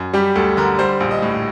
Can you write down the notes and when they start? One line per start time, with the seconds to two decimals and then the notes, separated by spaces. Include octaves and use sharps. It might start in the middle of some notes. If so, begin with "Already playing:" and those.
Already playing: F#2
0.14 G3 G4
0.36 D2 A4
0.57 D3 A#4
0.78 G3 C5
1.00 A#1
1.11 D#5
1.22 A2